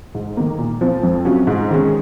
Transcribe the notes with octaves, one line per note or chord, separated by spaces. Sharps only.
G#2
D#3 A#3
A#2
F3 C4 F4
F2
C3 F#3 C#4 F4
G#2
D#3 G#3 C#4